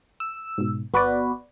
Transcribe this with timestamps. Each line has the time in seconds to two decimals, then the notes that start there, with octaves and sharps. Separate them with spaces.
0.20 E6
0.58 G#2 B2
0.94 G1 B3 F#4 B4 D5